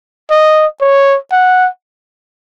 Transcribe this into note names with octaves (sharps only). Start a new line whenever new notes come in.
D#5
C#5
F#5